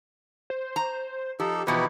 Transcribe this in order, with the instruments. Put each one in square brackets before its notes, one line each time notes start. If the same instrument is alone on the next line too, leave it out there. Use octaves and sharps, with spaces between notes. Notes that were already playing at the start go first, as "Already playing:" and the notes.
[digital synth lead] C5
[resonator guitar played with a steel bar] A#5
[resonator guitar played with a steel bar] F3 [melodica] D#4 A4 [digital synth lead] G4
[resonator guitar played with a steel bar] E2 B2 F3 [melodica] D#4 E4 G4 [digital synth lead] B4